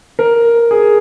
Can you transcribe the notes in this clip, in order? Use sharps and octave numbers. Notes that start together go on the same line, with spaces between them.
A#4
G#4